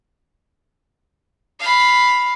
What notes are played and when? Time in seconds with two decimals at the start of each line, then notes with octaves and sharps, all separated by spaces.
1.60 F5 B5